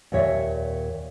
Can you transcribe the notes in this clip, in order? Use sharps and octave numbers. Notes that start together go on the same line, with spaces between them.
D#2 A#2 C#5 E5